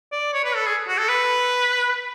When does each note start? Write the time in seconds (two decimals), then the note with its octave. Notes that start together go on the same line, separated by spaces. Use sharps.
0.12 D5
0.33 C#5
0.44 B4
0.55 A4
0.66 G#4
0.88 F#4
0.98 A4
1.09 B4